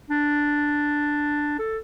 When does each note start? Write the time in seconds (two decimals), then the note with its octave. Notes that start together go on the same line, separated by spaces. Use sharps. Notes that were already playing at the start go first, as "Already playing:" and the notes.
0.10 D4
1.59 A4